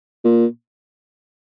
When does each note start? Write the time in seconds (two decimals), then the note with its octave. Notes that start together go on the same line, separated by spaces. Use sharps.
0.25 A#2